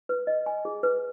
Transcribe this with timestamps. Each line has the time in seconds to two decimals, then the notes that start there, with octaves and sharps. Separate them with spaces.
0.09 B4
0.27 D#5
0.46 G#5
0.65 G#4
0.83 B4